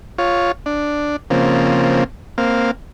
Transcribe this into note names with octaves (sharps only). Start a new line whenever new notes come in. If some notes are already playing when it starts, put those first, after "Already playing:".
F4 C#5
D4
C#3 F3 A#3 C4
A#3 C4 F5